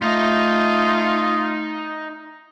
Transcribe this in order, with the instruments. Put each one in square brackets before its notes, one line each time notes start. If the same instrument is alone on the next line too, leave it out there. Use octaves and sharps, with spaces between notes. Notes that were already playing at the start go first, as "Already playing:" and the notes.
[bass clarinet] A3 [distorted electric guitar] D#4 D#5 [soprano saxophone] F4